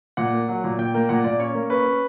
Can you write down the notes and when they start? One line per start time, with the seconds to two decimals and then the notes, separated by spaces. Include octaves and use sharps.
0.17 A#2 F#5
0.33 A#3
0.48 F#3
0.64 A#2
0.79 A#2 G5
0.94 A#3 G5
1.09 A#2 F#5
1.24 A#2 D5
1.40 C#4 C#5
1.54 A#3
1.70 C#4 B4
1.86 C#4